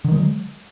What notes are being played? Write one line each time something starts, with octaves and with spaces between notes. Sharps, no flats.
D3 D#3 F#3 G#3